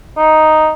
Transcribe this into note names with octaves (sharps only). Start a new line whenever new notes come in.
D#4